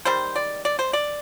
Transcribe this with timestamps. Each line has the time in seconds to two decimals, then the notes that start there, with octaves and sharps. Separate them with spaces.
0.05 D#3 G3 C5
0.36 D5
0.65 D5
0.79 C5
0.93 D5